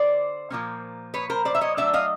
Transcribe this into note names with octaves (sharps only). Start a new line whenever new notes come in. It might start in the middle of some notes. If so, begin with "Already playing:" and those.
Already playing: D3 C5 D5
A#2 F3 A#3 C#4
B4 C#5
A#4 C5
C5 D5
E5
C#5 D#5
F#3 A3 D4 D5 E5
D#5 F5